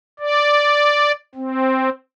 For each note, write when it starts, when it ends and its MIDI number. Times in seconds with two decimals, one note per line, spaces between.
0.19 1.12 74
1.35 1.89 60